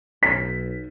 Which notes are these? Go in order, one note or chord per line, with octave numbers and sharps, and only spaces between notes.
B1 B6